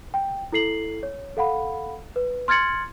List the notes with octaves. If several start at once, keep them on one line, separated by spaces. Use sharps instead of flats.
G5
E4 A4 C7 F#7
C#5
A4 F5 F#5 B5
B4
C6 F6 G#6 A6 C#7 F#7